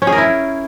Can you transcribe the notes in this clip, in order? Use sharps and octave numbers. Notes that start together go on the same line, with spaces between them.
C#4
G#4
A#4
E4